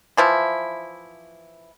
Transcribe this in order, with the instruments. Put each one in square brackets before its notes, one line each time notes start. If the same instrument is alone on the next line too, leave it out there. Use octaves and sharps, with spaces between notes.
[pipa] E3 F3 E4